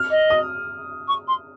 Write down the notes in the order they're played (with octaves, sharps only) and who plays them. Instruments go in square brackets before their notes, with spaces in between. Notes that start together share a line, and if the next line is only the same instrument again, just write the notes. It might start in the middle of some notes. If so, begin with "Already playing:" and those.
Already playing: [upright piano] F6
[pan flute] D#5
[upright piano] D#6
[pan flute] C#6
C6